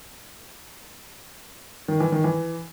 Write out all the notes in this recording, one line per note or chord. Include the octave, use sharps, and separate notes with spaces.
D#3
E3
D#3
E3